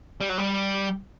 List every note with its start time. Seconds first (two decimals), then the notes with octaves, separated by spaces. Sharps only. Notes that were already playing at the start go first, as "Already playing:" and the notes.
0.21 G3
0.29 F#3
0.38 G3